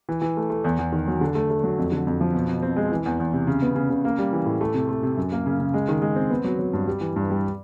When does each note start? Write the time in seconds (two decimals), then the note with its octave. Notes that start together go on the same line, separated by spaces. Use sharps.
0.09 E3
0.22 E3
0.37 A3
0.50 A3
0.64 E2
0.79 E2
0.92 D#3
1.08 F#3
1.21 D3
1.35 A3
1.50 A3
1.64 F#3
1.78 F2
1.92 D3
2.07 F2
2.21 F3
2.34 B2
2.49 B2
2.62 C4
2.76 G#3
2.92 E3
3.06 E2
3.20 E2
3.33 C3
3.47 C#3
3.62 B3
3.75 C#3
3.90 C#3
4.05 A#3
4.19 G3
4.33 E3
4.46 A2
4.61 A3
4.74 C3
4.89 A3
5.03 C3
5.17 F#2
5.32 A#3
5.46 C#3
5.60 C#3
5.74 G#3
5.88 D#3
6.02 G#3
6.16 C4
6.30 B3
6.44 F#3
6.59 F#3
6.73 G2
6.87 G3
7.01 E3
7.16 G2
7.30 G3